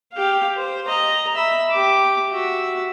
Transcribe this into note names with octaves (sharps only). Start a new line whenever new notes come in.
G4 F5
C5
D#5 A#5
E5 B5
G4 D6
F#4 E5